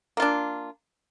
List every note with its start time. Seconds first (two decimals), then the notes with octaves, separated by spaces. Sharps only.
0.17 A#3
0.20 F4
0.22 D4